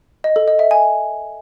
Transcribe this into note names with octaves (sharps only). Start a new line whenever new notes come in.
D#5
A4
D#5
E5
G#5